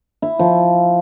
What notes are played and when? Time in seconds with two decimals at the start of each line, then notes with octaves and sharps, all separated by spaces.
0.22 E4
0.39 F3